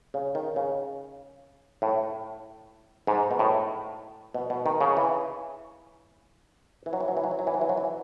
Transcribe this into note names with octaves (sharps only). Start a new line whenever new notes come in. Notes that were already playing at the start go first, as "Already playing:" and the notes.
C#3
D#3
C#3
A2
G#2
B2
A2
B2
B2
D#3
C#3
E3
E3
F#3
E3
F#3
E3
F#3
E3
F#3
E3
F#3
E3
F#3
E3